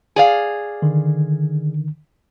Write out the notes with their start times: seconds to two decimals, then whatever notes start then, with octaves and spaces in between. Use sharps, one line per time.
0.16 G#4 D5 F5
0.82 D3 D#3